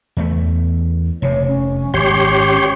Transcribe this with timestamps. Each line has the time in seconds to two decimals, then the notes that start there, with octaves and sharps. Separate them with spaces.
0.17 E2 A3
1.22 F1 C3 C#5
1.47 C#4
1.94 G#1 G4 C#5 C6